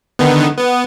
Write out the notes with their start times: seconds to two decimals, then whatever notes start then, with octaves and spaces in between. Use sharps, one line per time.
0.19 D3 D#3 B3
0.58 B3